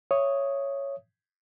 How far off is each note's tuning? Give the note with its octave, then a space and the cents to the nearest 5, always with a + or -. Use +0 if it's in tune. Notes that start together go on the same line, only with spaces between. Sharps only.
C#5 +0 E5 +25 D#6 +0